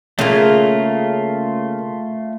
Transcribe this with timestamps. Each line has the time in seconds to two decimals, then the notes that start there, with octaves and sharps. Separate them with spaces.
0.19 C#3 A3 A#3 F4